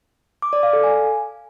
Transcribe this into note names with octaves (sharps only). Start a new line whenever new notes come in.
D6
D5
F5
A4
G#5